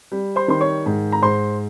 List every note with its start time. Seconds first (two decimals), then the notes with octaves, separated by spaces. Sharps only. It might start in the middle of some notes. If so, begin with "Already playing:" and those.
0.12 G3
0.36 C5 C6
0.48 D#3 C6
0.61 C#5 C#6
0.86 G#2
1.12 A#5
1.22 G#2 C5 C6